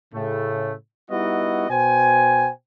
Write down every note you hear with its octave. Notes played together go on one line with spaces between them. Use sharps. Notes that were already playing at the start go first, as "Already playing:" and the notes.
A2 C#3 A3
G3 B3 D#4 E4 F#4 D#5
B2 C5 G5 G#5